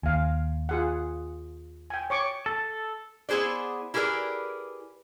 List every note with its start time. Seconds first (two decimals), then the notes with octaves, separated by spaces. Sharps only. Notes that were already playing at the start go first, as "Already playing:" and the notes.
0.03 D#2 F5 G#5
0.69 F4 G#4 F#5
1.90 G5 G#5
2.10 C#5 C#6 D6
2.46 A4
3.29 B3 E4 G#4 C5 D5
3.94 E4 G4 G#4 A#4 B4 D5